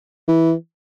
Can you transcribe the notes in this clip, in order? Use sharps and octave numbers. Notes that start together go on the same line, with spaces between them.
E3